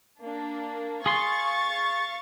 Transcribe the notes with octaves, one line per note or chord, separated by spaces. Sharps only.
A#3 D4
G#4 F5 C6 C#6 A6